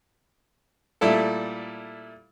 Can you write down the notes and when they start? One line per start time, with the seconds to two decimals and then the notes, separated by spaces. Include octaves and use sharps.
1.01 A#2 G3 A3 E4 A4